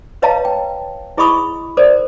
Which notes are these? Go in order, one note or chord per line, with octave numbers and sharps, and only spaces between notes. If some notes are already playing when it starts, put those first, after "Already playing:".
B4 C#5 D#5 F5 A5 A#5
G5
E4 G#4 D#5 B5 C#6 D#6
A4 A#4 C5 D5